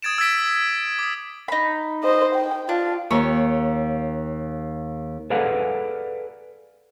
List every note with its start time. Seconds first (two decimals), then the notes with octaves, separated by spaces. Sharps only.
0.02 D#6 G#6 A6 D7 E7
0.18 E6 G#6 A6 B6 D7
0.99 D6 D#6
1.48 D#4 B5
2.04 C5 D#5
2.35 G5
2.69 D4 F4
3.10 D#2 C#5
5.30 G#4 A4 B4 D5 F5 F#5